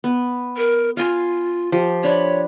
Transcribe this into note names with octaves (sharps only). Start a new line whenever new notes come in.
B3
A#4
F4 F5 G#5
F3 G4
D4 C#5 B5